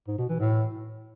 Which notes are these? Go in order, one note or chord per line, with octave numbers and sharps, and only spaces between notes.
G#2
B2
E3
A2